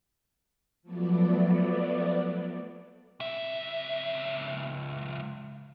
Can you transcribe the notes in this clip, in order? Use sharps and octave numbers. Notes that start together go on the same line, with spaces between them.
F3 F#3 A3 B3 D5
C#2 E5